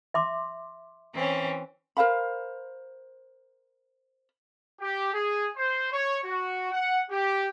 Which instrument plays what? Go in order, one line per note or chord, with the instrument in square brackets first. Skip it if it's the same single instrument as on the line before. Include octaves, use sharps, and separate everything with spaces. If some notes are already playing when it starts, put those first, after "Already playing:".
[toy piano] E5 C6 D6
[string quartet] E3 C4 C#4
[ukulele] A#4 C5 F5 B5
[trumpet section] G4
G#4
C5
C#5
F#4
F#5
G4